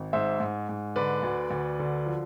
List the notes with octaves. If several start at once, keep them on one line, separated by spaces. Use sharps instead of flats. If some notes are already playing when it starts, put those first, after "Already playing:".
Already playing: G#1
G#2 C5 E5
G#2
G#2
D3 B4 D5
D2
D2
D3
F3